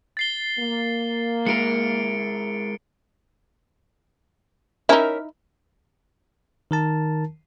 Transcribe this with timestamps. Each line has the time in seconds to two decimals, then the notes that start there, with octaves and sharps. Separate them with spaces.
0.17 A6 C7 G7
0.58 A#3
1.47 G#3 E4 A#4 C#7 D7
4.89 C#4 D#4 E4 A#4 E5
6.71 D#3 A#4 A5